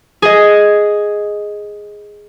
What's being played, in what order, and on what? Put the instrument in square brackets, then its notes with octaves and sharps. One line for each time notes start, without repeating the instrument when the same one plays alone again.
[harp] G#4 D#5